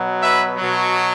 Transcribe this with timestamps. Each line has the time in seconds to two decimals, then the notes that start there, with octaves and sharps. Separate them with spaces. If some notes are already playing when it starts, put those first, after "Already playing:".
Already playing: B2 F#3
0.21 B4 E5
0.57 B2 F#3